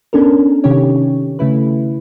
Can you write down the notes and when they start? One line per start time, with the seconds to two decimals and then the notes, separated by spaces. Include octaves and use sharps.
0.13 B3 C#4 D4 A4 A#4
0.64 C3 D#3 C#4 G4 C#5
1.39 C#3 A3 E4 B4